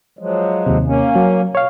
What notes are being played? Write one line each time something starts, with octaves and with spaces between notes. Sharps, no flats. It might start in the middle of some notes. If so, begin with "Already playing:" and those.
F3 F#3 G#3
D#2 C3
A#3 C#4
F#3
B2 C#5 F5